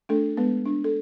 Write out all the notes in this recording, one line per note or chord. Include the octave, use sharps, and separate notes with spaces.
A3 D4 A4
G#3 B3 B4
D4
A4